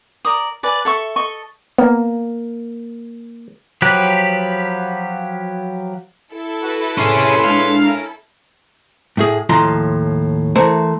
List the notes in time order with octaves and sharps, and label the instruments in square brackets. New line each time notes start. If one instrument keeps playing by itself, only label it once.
[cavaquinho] A#4 D5 D#6
B4 D5 G#5
A4 E5 C#6
A4 D#5 C#6
[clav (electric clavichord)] A#3 [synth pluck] B3
[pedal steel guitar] F3 F#3 G4 B4
[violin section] E4 A4
[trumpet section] F#4 B4
[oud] F2 A2 C3 [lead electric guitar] C#4 G#4 [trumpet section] B4 C#5 C6
[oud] A#2 G#3 D4 [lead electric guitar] F5
[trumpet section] A3 C#4 A#4
[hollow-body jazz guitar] A2 A3 G#4
D#2 A2 F3 F4 A#5 C6
E3 A3 A#4 C5